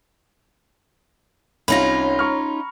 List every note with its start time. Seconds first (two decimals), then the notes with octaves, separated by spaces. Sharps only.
1.68 C2 C#4 D#4 F4 C#5 B5 A#6
2.19 A#5 C#6 F6